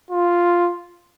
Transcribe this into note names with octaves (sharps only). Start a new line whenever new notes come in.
F4